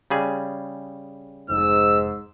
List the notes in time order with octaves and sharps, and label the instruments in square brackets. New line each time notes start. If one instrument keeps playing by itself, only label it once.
[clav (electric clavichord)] C#3 G3 G#4
[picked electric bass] F1 [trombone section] G#2 [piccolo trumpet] E6